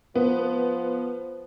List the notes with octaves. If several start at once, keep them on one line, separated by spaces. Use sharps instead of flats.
F3 B3